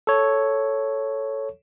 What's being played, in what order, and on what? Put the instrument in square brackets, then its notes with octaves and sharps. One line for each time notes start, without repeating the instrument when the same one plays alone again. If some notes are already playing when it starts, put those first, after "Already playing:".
[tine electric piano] A4 C#5